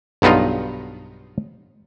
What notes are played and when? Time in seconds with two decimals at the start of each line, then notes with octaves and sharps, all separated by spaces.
0.22 B1 G2 B3 D#4 F4